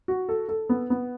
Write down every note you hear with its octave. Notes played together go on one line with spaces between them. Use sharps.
F#4
A4
A4
B3
B3